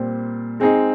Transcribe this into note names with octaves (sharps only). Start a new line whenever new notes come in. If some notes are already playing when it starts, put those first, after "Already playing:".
Already playing: A#2 G3 C4 C5
G#3 C4 D#4 G#4